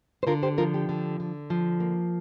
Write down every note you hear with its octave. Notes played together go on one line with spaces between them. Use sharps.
C5
D3 F4 A#4
G4 C5
F3 F4 A#4
D4 G4
D3
D3
F3
A#3